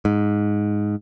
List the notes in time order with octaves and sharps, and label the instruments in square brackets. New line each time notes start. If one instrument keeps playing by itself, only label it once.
[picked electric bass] G#2